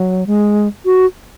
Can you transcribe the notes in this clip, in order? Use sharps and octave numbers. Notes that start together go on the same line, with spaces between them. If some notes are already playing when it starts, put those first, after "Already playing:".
Already playing: F#3
G#3
F#4